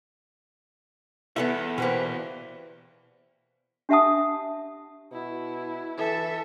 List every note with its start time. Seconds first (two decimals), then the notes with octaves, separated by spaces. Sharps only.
1.36 E2 B3 A4 E5
1.78 B2 A#3 G4 B4 C5
3.89 D4 G4 E5 F#5 A5 D#6
5.12 B2 E4
5.98 E3 A4 E5